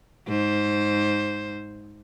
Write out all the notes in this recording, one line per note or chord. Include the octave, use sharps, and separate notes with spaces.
G#2 C5